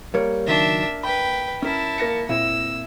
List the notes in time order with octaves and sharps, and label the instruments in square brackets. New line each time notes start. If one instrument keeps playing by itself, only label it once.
[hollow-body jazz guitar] G3 C#5 [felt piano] A#3
[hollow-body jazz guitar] C#2 D#3 F#3 [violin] D4 E5
[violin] B4 G5 [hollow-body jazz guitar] B5
[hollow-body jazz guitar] C#4 A#4 [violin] E4 A5
[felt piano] A#3 A#6 C#7
[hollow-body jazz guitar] A#2 C4 [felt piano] E4 [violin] E6